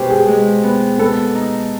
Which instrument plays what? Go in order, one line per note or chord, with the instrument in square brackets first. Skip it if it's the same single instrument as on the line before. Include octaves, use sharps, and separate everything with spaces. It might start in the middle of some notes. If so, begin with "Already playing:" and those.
Already playing: [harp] B2 G#3 [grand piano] G4 C5
[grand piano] G#4
[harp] G#3
B3
[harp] B3 [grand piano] A4
[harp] D#4